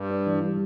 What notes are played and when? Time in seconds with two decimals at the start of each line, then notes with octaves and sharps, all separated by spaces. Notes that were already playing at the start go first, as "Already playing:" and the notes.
Already playing: G2
0.10 D4
0.27 E3
0.42 G3